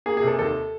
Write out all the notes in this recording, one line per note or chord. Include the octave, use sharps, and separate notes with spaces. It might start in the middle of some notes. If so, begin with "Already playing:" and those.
A#3 G#4
C3 G#4
A4
D#2 A4